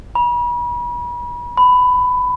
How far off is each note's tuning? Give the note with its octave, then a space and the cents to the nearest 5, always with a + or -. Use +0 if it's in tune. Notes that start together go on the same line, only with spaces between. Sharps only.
B5 -40
B5 +15